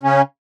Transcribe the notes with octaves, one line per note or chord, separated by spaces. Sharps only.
C#3 C#4